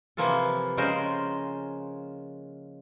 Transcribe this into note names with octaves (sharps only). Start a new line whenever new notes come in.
C3 E3 F3 A#3 F4 A4
C#3 G#3 F4 A#4 C5